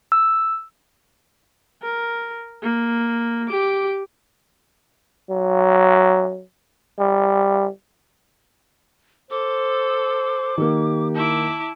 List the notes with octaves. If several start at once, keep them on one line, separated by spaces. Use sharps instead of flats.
E6
A#4
A#3
G4 D6
F#3
G3
A4 C5 D6
D#3 A#3 G4
E4 A5 D6